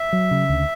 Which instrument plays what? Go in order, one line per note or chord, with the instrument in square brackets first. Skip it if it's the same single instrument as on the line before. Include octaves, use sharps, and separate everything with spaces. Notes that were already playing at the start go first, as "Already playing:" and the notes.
Already playing: [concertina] E5
[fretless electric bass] F#3
C#3
D2